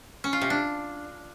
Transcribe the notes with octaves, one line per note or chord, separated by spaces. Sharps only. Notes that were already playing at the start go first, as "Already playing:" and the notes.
C#4
F4
C3
D4